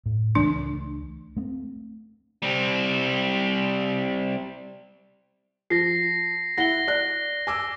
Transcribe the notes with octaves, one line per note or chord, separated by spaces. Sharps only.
A2
C#2 E3 A3 D4
A3 C4
G3 C4
F3 A#6 C7
E4 F#5 A#6 G7
D5 F#6
G#5 D6 E6